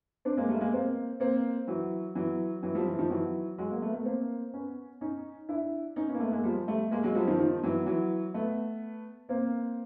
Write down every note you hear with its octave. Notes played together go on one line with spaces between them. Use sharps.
C4 D4
G#3 A#3
G3 A3
G#3 A#3
A#3 C4
A#3 C4
E3 F#3
E3 F#3
E3 F#3
F3 G3
E3
D#3 F3
E3 F#3
F#3 G#3
G#3 A#3
A3 B3
A3 B3
A#3 C4
B3 C#4
C#4 D#4
D4 E4
C#4 D#4
B3 C#4
A#3
A3 B3
G#3 A#3
F3 G3
G3 A3
G#3 A#3
F#3 G#3
F3 G3
D#3 F3
D#3 F3
E3 F#3
E3 F#3
A3 B3
A#3 C4